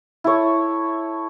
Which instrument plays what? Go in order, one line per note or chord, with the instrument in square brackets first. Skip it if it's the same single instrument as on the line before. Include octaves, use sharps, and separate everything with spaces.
[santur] E4 A4 C#5